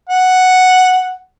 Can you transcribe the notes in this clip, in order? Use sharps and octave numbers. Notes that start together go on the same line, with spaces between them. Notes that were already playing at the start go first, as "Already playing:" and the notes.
F#5